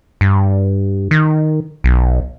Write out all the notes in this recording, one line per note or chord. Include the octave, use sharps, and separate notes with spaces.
G2
D#3
B1